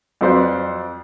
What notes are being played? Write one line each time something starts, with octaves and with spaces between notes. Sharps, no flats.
F2 F#3 B4 C5 D5